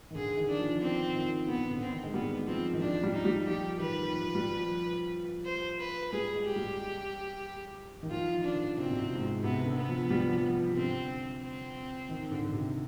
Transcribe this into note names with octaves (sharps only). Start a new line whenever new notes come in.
D#3
D3 G#4
D#3
D4
F3
C4
D#3
D3 B3
D3
C4
D#3
G#3
G3 B3
F3 C4
D#3
F3 D4
G3
D#4
G3
F3 G4
D#3 B4
F3
G3
F3
C5
B4
G3 G#4
G#3
G4
G3
D#3
F3 F4
D#3
D4
D3
C3 C4
B2
C3
B2
G#2
B2
C3 B3
D3
B3
F3
G3
F3
F3
C3
D3 C4
C4
D#3
D3
D3
C3